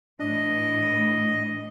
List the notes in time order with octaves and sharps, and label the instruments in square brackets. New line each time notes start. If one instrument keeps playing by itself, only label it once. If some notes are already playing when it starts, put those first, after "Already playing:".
[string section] A2 E3 [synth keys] D4 [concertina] D#5